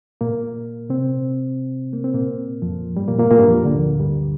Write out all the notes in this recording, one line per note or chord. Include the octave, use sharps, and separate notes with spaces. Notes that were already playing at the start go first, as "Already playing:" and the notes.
A#2 A#3
C3 C4
A#3
C4
A#2 A#3
F2 F3
G2 G3
A#2 A#3
A#2 A#3
A#2 A#3
G2 G3
F2 F3
D2 D3
G2 G3